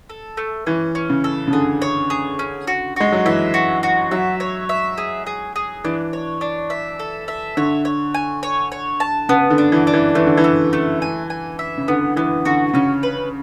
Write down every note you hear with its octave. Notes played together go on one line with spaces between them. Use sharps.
A4
A3
E3 C#4
C#4
C#3
A4
C#3
D3 G#4
C#5
G#4
C#4
F#4
G#3 F#4
F#3
E3 E5
F#4
F#4
F#3 E5
C#5
E5
G#4
G#4
G#4
E3 D4
C#5
D4
E5
A4
E5
D3 C#5
C#5
G#5
C#5
C#5
A5
C#3 B3
D3
D4
E3
D4
E3
E3 A3
D3
E3
A3
A3
G#5
G#5
E5
C#3
D3 B3
E3 B3
D3 F#4
C#3 C#4
B4